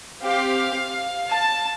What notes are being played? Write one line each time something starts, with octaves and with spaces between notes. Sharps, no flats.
C4 G4 F5
A5